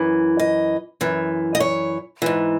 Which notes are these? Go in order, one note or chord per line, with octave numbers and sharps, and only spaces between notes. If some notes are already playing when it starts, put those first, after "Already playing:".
Already playing: F#2 E3
D#5
F#2 E3
D#5
C#5
G#2 E3